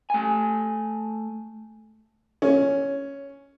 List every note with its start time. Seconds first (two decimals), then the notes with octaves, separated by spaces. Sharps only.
0.10 A3 G#5
2.42 C#4